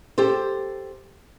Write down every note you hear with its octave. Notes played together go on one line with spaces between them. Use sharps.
G4 A4 C5